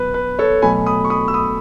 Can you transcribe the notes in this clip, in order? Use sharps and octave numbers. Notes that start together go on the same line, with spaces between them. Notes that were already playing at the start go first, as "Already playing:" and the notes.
Already playing: B2 F#3 B3 B4
B4
A4 C#5
B2 F#3 A3 G#5 B5
B5 D#6
C#6
B5 D#6
E6
B5 D#6